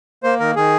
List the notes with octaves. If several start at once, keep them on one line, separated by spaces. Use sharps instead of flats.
A#3 C5
D#3 A#4
D#3 G#4